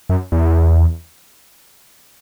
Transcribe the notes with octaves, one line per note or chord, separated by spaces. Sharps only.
F#2
E2